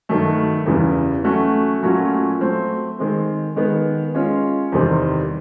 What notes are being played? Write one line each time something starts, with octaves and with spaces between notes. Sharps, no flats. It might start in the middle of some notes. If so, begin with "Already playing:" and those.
G2 D#3 F#3 A3
E2 C#3 E3 G3
F#3 A3 C#4 F#4
A#2 F#3 A3 C#4 F#4
F#3 A3 C4
D#3 G#3 C4
D#3 G#3 B3
G#3 C#4 F4 G#4 C#5
E2 C3 D#3 G3 C4